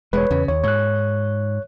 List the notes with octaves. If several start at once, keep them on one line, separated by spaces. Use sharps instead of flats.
E1 G#3 B4 C#5
E2 C#3
D#2 C#5
G#2 C#5 F#6